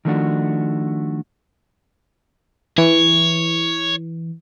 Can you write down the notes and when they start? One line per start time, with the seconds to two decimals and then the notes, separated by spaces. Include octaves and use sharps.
0.05 D#3 F3 A3 C#4 D4 F#4
2.78 E3 C#5